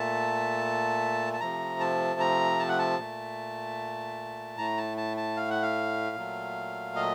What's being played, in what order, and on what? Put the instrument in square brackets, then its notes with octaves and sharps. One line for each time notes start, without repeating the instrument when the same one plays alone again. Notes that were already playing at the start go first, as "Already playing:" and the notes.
Already playing: [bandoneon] A#2 A3 A5
A5
C3 F3 A3 A#5
A5
A#5
A5
F#5
A5
A#2 A3
A2 A3 A#5
A5
A5
A5
F5
F#5
F5
A#2 F#3 A3
D#5